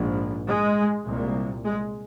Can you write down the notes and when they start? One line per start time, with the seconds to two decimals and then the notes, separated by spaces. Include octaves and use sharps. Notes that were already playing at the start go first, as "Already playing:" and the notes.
Already playing: A#1 G#2
0.48 G#3
1.06 C2 A#2
1.64 G#3